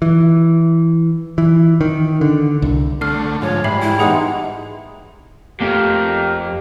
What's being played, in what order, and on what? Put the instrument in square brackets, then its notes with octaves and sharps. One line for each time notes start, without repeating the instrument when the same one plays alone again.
[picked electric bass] E3
E3
D#3
D3
C2
[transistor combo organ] D3 A3 [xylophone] F6 C7
[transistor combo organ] G#2 F3 [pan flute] C#5
[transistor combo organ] G#2 [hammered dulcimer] G3 [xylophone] E5 C7 F#7
[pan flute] E4
[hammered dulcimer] B2 E3 G#3 [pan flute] D#4 [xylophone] G#4 F#5 D#6
[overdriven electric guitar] F2 [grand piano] A3 [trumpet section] A#3 F5 G5 [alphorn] G4